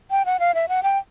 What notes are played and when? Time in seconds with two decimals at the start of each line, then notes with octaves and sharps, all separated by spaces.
0.11 G5
0.25 F#5
0.40 F5
0.54 E5
0.68 F#5
0.83 G5